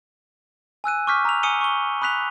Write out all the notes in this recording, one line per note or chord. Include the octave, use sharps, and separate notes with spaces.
G#5 E6 F#6 D#7
C#6 D6 F6 G6 B6
A#5 E6 F7
G#5 D#6 C#7 D#7 G7
C#6 G7
B5 D#6 F#6 B6 F7